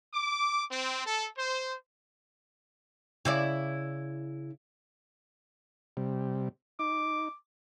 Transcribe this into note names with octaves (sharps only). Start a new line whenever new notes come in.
D6
C4
A4
C5
C#3 E4 D5
C3 G3
D#4 D6